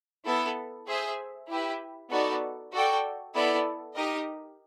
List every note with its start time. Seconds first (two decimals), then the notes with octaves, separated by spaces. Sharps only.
0.25 B3 E4 A4
0.87 G#4 C5 E5
1.49 E4 G4 B4 E5
2.10 B3 D#4 F#4 A4 D5
2.73 F#4 A4 D5 G5
3.34 B3 E4 A4 D5
3.95 D#4 G4 A#4 D#5